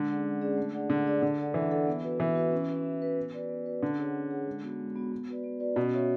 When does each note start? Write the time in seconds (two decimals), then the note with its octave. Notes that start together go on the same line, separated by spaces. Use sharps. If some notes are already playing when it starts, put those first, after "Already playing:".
Already playing: D3 G#3
0.09 C#4 G#4 D5 F#5
0.24 G#3
0.41 C#4 G#4 D5 F#5
0.57 A3
0.74 D4 G#4 D5 F#5
0.90 D3 A3
1.06 D4 G#4 D5 F#5
1.22 D3 D4
1.38 A4 D5 F#5
1.54 E3 D4
1.71 A4 D5 F#5
1.87 B3
2.03 F#4 B4 E5
2.19 E3 B3
2.35 F#4 B4 E5
2.52 C#4
2.68 F#4 B4 E5
2.85 C#4
3.01 F#4 B4 E5
3.16 B3
3.34 F#4 B4 D5
3.49 B3
3.66 F#4 B4 D5
3.82 D3 C#4
3.98 G#4 C#5 F#5
4.14 C#4
4.31 G#4 C#5 F#5
4.47 G#3
4.63 B3 F#4
4.80 G#3
4.96 B3 F#4
5.12 B3
5.28 F#4 B4 D5
5.44 B3
5.60 F#4 B4 D5
5.76 B2 C#4
5.92 F#4 C#5 E5